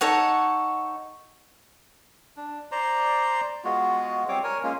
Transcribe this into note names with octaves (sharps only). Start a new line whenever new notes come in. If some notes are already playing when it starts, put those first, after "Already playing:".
D#4 A4 C#5 F#5
D4
C5 D5 A#5 C6
G#3 B3 F4 F#4
G3 C4 C#5 D6
A#4 C#5 G#5
G#3 A#3 C#4 F4